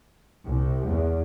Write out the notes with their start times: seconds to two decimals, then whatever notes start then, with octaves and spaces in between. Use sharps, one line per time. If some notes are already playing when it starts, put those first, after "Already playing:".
0.45 C2
0.88 E2